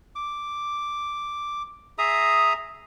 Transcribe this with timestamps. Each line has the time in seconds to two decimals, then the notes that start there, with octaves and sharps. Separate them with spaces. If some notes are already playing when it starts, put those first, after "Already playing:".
0.15 D6
1.98 G#4 E5 A#5 D#6